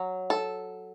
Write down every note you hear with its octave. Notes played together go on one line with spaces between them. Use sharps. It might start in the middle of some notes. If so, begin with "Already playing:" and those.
Already playing: F#3
A4